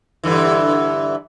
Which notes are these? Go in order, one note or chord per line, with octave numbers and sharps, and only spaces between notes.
G2 D3 E3